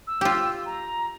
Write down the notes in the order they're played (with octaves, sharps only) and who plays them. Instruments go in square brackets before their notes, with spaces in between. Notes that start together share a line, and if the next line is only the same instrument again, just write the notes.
[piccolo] E6
[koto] F4 G4
[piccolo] A#5